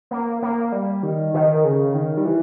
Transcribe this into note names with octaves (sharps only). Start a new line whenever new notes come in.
A#3
A#3
G3
D#3
D#3
C#3
D#3
G3
E3